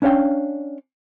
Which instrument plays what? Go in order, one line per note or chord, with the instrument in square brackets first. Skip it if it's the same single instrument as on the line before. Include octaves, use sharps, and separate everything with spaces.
[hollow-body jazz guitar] C#4 D4 C#5 F5 G5